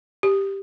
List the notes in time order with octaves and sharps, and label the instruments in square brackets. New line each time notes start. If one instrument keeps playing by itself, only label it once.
[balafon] G4